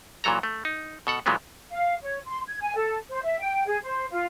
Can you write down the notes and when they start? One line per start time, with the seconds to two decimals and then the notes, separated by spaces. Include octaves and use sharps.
0.24 A#2 E3 F#3 A4 A#5
0.43 A3
0.65 D#4
1.07 B2 A4 F#5
1.26 A#2 E3 F#3 G#3 A3 B3
1.70 F5
2.02 C#5
2.26 C6
2.47 G#6
2.60 G#5
2.75 A4
3.08 C5
3.23 E5
3.40 G5
3.66 G#4
3.83 C5
4.11 F4